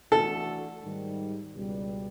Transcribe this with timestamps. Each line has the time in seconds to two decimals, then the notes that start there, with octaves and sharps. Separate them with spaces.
0.12 E3 A3 D4 F#4 A4
0.83 G#2 D#3 G3
1.54 C#2 B2 G3